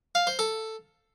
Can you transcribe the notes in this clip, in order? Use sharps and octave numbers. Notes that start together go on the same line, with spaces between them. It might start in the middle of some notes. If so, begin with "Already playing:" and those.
F5
C5
A4